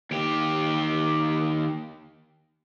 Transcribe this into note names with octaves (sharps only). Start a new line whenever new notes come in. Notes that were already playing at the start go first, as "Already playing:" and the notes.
D#2 G4